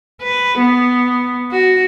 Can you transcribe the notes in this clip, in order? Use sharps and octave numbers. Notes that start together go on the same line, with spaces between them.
B4
B3
F#4